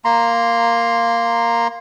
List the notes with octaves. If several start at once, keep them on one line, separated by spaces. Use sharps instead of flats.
A#3 A#5 C6